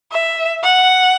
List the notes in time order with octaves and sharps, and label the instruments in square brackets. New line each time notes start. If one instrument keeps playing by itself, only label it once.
[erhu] E5
F#5